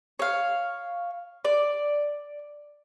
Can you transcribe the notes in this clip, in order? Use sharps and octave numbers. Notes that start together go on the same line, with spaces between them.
C#5 F5
D5